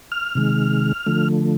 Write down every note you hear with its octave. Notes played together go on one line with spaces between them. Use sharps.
F6
C3 D#3 G#3
D3 F3 A3